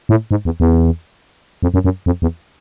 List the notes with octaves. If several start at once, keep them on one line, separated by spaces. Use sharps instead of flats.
A2
G#2
E2
E2
F2
F#2
F#2
F2
E2